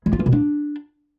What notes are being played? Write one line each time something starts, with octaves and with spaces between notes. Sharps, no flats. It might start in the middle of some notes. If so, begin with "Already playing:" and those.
G#3
F4
E3
B2
D4